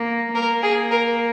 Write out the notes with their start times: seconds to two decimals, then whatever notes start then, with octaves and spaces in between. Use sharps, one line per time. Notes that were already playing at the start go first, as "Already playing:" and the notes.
Already playing: A#3
0.35 A#3 A#4
0.63 G#4
0.91 A#4